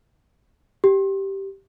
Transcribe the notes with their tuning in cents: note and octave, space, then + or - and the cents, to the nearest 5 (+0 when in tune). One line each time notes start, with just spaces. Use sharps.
G4 -10